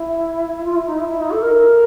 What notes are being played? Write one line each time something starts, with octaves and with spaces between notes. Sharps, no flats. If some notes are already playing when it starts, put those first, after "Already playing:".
Already playing: E4
F4
E4
D#4
E4
E4
D#4
A4
A#4